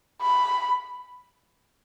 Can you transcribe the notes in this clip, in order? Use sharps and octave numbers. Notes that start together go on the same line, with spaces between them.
B5